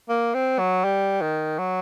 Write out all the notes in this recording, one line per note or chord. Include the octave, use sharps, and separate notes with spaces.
A#3
C4
F#3
G3
D#3
F#3